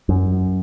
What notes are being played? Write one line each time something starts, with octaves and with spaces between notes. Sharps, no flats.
F#2